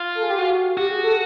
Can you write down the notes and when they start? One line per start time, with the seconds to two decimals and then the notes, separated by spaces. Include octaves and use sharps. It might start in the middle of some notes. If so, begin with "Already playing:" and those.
Already playing: F4
0.15 A4
0.23 G#4
0.30 G4
0.39 F#4
0.77 F#4 G4
0.91 G#4
1.04 A4